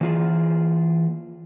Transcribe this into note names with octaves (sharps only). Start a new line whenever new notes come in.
E3 A#3 F4 G#4